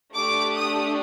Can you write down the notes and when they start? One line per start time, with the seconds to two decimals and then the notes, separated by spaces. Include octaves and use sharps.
0.14 A3 D4 G4 D6
0.55 D#6